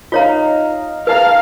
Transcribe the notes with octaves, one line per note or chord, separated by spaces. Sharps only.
D#4 F4 C#5 F5 A#5
G#4 B4 F5 A5 A#5